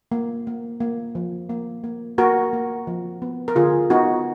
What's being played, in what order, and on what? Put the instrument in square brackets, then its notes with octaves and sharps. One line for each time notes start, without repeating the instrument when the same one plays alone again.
[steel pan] A#3
A#3
A#3
F3
A#3
A#3
A#3 F#4 A#4
A#3
F3
B3
A#4
D3 F4 G#4
B3 D#4 F#4